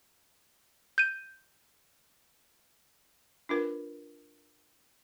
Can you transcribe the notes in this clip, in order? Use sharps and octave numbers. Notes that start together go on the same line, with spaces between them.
G6 D#7
D4 F4 A#4 B4